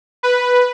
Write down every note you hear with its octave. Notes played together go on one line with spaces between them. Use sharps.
B4